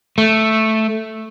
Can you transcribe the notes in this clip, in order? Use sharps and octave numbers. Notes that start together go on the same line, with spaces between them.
A3